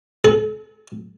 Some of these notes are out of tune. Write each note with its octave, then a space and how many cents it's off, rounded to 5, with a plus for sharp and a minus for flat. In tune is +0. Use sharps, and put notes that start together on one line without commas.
A4 -40